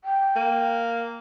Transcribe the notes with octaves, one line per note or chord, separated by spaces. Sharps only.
G5
A#3